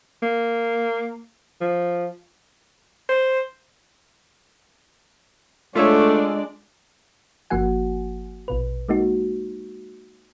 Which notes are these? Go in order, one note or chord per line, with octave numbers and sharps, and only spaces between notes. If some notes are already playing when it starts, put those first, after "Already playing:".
A#3
F3
C5
G#3 A3 D4 F4 A4 C#5 D5
G1 F3 A#3 F#4 F#5 G#5
A#1 B2 B4
G#3 A#3 D#4 F#4